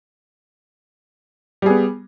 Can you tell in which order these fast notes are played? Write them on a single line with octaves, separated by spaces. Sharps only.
G3 G#4 B3